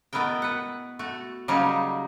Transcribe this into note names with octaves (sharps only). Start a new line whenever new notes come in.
B2 A3 B3 E4 A#4 G5
B4 F#5
A3 F#4
C#3 F#3 G3 A#3 D#4 A#4